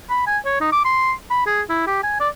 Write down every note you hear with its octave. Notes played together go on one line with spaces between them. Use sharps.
B5
G#5
C#5
D#4
D6
C6
B5
G#4
E4
G4
G#5
D5